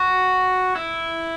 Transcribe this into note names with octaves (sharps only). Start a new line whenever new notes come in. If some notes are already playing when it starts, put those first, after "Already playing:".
Already playing: F#4
E4